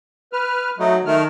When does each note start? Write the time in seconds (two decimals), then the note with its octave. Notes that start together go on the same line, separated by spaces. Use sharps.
0.33 B4 F6
0.79 F#3 A3 D#4
1.05 D#3 A3 F6